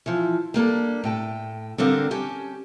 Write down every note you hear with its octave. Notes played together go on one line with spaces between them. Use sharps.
E3 F3
G3 A#3 D4 A4
A2 G5 A5
D3 G3 C4 A#4 F5
C#4 G4 A5